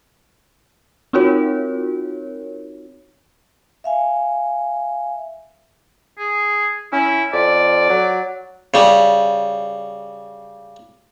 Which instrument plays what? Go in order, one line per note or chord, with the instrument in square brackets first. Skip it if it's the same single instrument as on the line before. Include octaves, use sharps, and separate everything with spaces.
[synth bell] C4 D#4 F4 F#4 A#4 C#5
[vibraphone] E5 F5 G#5
[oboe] G#4
[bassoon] C#4 [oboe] E4
[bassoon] F2 [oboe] D5
[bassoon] F#3
[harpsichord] C#3 G3